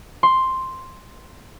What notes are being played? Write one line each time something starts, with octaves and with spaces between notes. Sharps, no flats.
C6